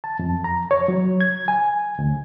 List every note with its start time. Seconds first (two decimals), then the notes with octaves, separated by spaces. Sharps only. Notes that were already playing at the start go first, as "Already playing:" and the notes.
0.04 A5
0.19 F2
0.44 A#5
0.71 C#5
0.88 F#3
1.21 G#6
1.48 G#5
1.99 D2